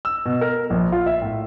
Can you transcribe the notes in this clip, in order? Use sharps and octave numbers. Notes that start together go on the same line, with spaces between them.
E6
B2
A#4
A#1
F4
E5
A2